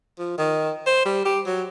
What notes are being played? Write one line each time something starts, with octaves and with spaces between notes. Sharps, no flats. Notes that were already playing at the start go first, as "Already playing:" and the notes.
F3
D#3
C5
G3
G4
F#3